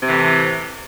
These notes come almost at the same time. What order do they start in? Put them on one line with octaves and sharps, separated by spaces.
C3 E3 A2